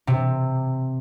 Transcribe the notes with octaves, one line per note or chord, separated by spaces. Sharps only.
C3